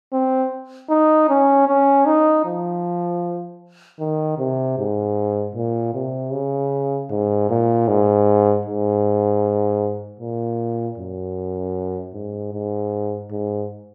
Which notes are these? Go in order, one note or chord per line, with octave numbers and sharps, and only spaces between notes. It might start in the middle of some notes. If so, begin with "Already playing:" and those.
C4
D#4
C#4
C#4
D#4
F3
D#3
C3
G#2
A#2
C3
C#3
G#2
A#2
G#2
G#2
A#2
F#2
G#2
G#2
G#2